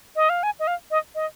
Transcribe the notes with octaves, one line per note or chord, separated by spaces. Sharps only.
D#5
F5
G#5
D#5
F5
D#5
D#5